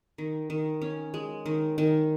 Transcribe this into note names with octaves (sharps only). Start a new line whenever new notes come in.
D#3
D#3
C#4
G#3
D#3
D#3